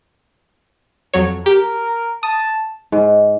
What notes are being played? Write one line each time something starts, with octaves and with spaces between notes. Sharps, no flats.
F2 F#3 C#5
G4 A#4
A5 D#6
G#2